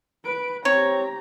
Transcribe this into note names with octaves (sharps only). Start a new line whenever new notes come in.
B4 D7
C4 G4 C#5 A#5